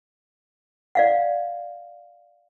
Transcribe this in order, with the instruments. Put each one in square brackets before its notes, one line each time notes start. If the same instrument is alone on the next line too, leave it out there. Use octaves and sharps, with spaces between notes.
[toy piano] D5 F5 F#5